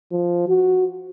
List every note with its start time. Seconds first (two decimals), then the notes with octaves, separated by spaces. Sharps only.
0.12 F3
0.48 F#4